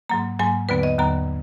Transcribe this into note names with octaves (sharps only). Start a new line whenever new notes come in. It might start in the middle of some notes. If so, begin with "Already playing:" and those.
G#2 F#3 A#3 A#5
G#2 F#3 A#3 G#5
D#2 D3 F#3 B3 B4
D#5
D#2 D3 F#3 B3 A#5